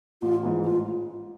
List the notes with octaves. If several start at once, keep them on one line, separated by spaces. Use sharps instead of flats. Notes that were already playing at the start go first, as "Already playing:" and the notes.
A1 F4
G#2 E3
A1 F4